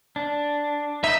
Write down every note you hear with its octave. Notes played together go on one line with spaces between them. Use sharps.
D4
D#4 B4 D#5 E5